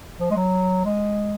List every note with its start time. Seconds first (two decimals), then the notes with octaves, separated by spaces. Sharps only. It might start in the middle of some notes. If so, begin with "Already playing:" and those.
0.20 F3
0.31 G#3
0.36 F#3
0.85 G#3